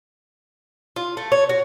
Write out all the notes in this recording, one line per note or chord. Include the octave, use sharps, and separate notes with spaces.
F4
A3
C#5
F#4